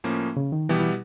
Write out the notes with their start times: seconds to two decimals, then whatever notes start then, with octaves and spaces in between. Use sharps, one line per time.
0.04 A2 F3 A#3 C#4
0.37 C#3
0.52 D#3
0.69 B2 E3 G3 B3 E4 G4
0.80 E3